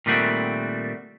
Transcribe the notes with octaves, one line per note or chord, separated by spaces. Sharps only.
A#2 D#3 G3 A3 C4 F#4